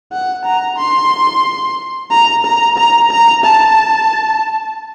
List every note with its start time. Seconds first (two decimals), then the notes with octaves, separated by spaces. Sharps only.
0.12 F#5
0.44 A#5
0.78 C6
2.11 A#5
2.45 A#5
2.78 A#5
3.11 A#5
3.44 A5